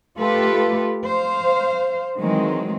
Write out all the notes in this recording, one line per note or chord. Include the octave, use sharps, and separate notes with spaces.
A3 F4 G4 A4 B4
C5 F5
D#3 E3 F#3 G#3 C4